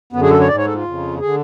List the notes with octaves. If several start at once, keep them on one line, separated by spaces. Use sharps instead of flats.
F#2 D3 B3
G#4
A4
C#5
G#2 D5
C#5
A4
F4
F2 C#3
D3 G#4